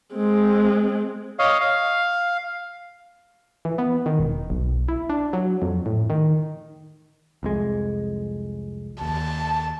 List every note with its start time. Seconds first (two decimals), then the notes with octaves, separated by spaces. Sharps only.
0.14 G#3 C4
1.39 C#5 D#5 F5
1.61 F5
3.65 E3
3.78 B3
4.06 D#3
4.19 E1
4.50 B1
4.88 E4
5.10 D4
5.33 F#3
5.62 F2
5.86 A2
6.10 D#3
7.43 C2 F2 G#3
9.01 D#2 A5